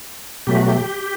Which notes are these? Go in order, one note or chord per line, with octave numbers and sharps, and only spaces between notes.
B2 F#3 A3 G4
F#4
G4